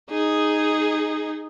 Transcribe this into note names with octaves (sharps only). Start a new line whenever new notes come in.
D#4 G#4